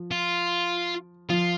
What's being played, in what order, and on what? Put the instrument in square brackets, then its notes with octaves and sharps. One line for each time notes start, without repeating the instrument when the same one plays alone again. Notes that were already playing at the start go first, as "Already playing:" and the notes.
Already playing: [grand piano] F3
[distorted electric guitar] F4
[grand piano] F3 [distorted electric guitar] F4